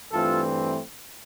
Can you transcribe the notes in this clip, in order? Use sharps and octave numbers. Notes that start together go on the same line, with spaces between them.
G2 E3 A3 C4 F4 A4